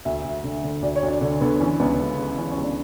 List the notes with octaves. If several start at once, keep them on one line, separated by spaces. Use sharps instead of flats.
D2 E5
D2
D3
D3
D2 D5
C#5
D2
D4
D3 D4
D3 B3
E3 C#4
C#2 B3
C#2
C#3
E3 C#4
C#4
C#2
D4